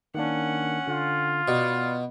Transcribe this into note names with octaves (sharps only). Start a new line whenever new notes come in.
D#3 A#3 C#4 D4 F#5
D3 F4
B2 B3 D5